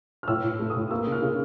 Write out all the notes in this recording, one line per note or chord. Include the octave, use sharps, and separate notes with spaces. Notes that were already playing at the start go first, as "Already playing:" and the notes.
F6
A2 E6
A2
A3
D#6
A2
A#3 E6
C#3
F6
C#3